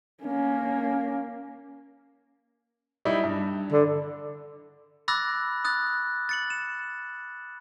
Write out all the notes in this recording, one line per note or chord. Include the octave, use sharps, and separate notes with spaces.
A#3 C#4
G3 D#4 E4
G2
D3
B5 D6 E6 F#6 A6 A#6
D#6 F#6 A6
A6 C#7 F#7
E7